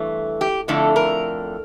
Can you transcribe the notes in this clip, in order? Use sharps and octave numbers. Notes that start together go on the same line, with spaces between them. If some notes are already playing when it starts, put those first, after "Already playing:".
Already playing: G2 E3 A3
G4
F2 D3 A3 E4 A4
A#4